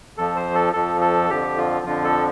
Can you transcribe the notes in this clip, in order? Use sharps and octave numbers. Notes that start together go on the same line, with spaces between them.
F2 F3 A4
C5
A4
F2 F3 A4
A4
F2 D3 F3 G4
F4
F2 D3 F3 F4
A4